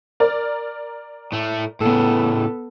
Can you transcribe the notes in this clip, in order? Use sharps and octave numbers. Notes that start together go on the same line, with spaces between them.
A#4 D5
A2 A3
A2 C#3 B3 A4